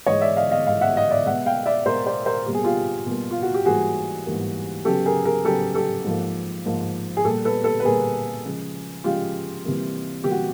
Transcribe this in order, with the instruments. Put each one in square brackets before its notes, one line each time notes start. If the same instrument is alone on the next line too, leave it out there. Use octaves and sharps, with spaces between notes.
[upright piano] G#2 E3 G#3 C#5 D#5
D5 E5
D#5 F5
D#5 F5
G#2 E3 G#3 D#5 F5
E5 F#5
D#5 F5
D5 E5
B2 G#3 B3 E5 F#5
F5 G5
D5 E5
B2 G#3 B3 A#4 C5
C5 D5
A#4 C5
B2 G3 A#3 G4
G#4
F4 G4
B2 G3 A#3
F4
F#4
G4
G#2 E3 G3 A#3 F#4 G#4
G#2 E3 G3 A#3
C#3 F#3 B3 G4 A4
G#4 A#4
G#4 A#4
C#3 F#3 B3 G4 A4
G4 A4
G#2 F3 A#3
G#2 F3 A#3
G#4
A#2 G3 A#3 G4 A4
A4 B4
A4 B4
B4
A#2 G3 A#3 G#4 A#4
C#3 F3 G#3
C#3 F3 G#3 F4 G4
C3 E3 G3 A#3
C3 E3 G3 A#3 G4
F#4